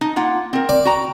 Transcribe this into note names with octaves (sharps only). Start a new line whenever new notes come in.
D#4
A#3 F4 F#5
C4 A#4
D5
F#4 G5 A#5